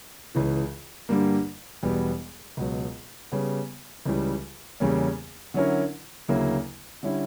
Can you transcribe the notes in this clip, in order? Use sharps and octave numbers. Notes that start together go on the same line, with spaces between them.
C#2 C#3 E3
G2 D3 G3 A#3
E1 E2 B2 G3 B3
C#2 B2 F#3
C#3 G3 B3
C#2 C#3 E3 G3
E2 C#3 G3 A#3 C#4
D3 F#3 C#4 E4 A#4
D2 C#3 F#3 A#3 E4
D3 G3 C#4 E4